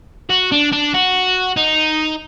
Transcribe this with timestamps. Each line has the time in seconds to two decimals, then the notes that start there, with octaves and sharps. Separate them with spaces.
0.30 F#4
0.52 D4
0.72 D4
0.94 F#4
1.57 D#4